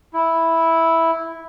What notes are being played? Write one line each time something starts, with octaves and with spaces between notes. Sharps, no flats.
E4